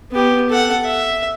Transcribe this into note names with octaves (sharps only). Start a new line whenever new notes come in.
B3 G4
A4 F#5
E5